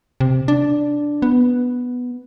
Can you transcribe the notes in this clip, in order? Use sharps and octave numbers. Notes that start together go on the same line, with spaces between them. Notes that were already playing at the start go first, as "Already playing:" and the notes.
C3
D4
B3